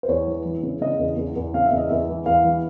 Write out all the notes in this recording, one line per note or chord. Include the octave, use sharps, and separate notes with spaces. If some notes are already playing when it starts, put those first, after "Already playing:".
C5
E2 C#5
E3
E3
C#3
C#3 D#5
E2
E2
E2
C#3 F5
E5
E2
D#5
E2 E5
E3
E2 F5
E3